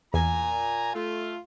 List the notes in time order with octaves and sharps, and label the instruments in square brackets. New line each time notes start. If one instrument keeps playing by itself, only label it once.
[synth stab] E2 [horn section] A#2 G#5 A#5
[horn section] A3 F4